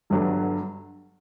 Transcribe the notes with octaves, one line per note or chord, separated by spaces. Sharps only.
G1 G2 D3 F#3